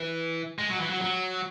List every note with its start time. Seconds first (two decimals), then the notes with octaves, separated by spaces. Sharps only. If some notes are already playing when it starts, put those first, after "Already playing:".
Already playing: E3
0.59 G#3
0.69 F#3
0.80 E3
0.89 F#3
1.02 F#3